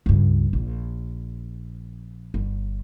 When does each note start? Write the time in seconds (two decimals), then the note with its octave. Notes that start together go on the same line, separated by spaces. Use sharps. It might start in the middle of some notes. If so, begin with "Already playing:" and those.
0.06 C#2 G2
0.53 A#1
2.34 G1